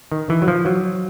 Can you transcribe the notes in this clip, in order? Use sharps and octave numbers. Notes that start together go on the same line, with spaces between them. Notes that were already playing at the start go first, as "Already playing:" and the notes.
D#3
E3
F#3
F3
F#3